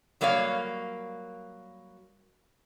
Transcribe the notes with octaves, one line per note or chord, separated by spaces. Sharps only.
F#3 G3 A#3 C#5 F5